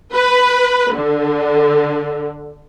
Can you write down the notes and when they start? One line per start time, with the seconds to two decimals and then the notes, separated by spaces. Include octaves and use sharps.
0.15 B4
0.94 D3